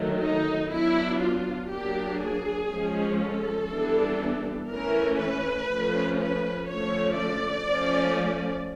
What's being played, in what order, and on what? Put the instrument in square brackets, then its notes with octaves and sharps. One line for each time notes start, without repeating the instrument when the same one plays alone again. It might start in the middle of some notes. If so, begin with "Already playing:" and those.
Already playing: [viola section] D#3 F#3 A3
D#4
F#3 B3 D4 E4
F4
F#3 A#3 D4 G4
G#4
F3 G#3 C#4
A4
E3 G3 B3 D4
E3 A3 C#4 A#4
B4
F3 A3 C#4
B4
D3 F3 A3 C#4 C#5
D5
F3 A3 C#4